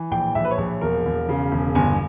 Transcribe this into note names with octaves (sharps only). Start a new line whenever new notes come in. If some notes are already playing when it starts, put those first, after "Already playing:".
Already playing: E3
A#1 G5
A#1 E5
B4
C#5
A#1
E1 A#4
E1
C#3
E1
G1 G#5